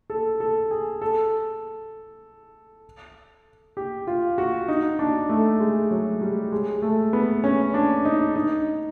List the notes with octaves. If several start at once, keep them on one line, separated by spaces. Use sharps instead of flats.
A4
A4
G#4
A4
G4
F4
F#4
D#4
D4
A3
G#3
F#3
G3
G#3
A3
B3
C#4
D4
D#4
D#4